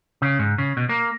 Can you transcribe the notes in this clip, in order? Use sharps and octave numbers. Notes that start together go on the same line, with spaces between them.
C#3
G#2
C#3
B2
A#3